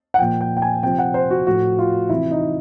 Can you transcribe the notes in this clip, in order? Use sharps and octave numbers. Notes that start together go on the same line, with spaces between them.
F#5
A#2 F3 G5
G5
G5
G#5
C3 F3 G5
F#5
C5
F#4
A2 F3 F#4
F4
C3 E3 E4
D#4